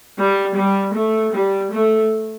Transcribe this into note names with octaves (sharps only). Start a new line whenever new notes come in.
G3
G3
A3
G3
A3